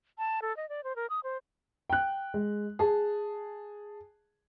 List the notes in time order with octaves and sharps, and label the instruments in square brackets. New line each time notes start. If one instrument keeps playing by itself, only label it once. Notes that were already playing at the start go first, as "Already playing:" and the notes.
[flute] A5
A4
D#5
D5
C5
A#4
D#6
C5
[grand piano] G5 F#6
G#3
G#4 A5